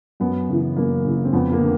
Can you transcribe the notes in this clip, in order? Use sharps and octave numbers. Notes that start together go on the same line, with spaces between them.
F#2 B3
C#3 E3
F#2 A#3
C#3 E3
C4
F2 B3
A#3
D3